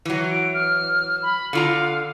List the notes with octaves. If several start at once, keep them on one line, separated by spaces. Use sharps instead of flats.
E3 F#3
D7
F6
B5
D3 F4 F5 A#5